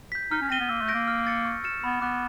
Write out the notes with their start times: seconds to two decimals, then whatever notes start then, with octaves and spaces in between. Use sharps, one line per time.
0.12 G6 B6
0.31 D#4 F6
0.41 C#4
0.50 C4 A#6 D#7 G7
0.60 B3
0.69 A#3 E6
0.81 A3
0.88 G6 A#6 D7
0.94 A#3
1.08 F6
1.27 A6 C#7
1.45 C#6
1.64 F6 A6 C#7 E7
1.84 B3 B5
2.01 B3 D6 F#6